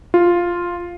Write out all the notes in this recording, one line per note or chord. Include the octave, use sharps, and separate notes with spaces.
F4